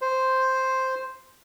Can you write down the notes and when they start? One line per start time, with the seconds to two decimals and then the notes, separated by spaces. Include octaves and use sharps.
0.01 C5